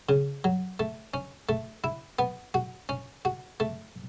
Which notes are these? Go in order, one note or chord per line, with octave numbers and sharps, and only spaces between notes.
C#3
F#3
A3
C#4
A3
E4
B3
F#4
C#4
F#4
A3